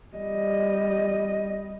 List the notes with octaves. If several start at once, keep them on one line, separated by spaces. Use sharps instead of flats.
G3 D#5